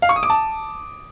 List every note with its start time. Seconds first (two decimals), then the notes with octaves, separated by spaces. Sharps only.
0.02 F5
0.09 C#6
0.16 D#6
0.23 D6
0.30 A5